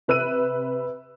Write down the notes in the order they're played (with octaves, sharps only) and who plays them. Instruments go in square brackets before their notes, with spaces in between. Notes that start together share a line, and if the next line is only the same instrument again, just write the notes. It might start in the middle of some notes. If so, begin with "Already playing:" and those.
[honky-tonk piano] C3 B4 E6 F#6 D#7